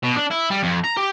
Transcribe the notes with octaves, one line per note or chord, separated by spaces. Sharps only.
B2
D4
E4
G3
F2
A#5
G4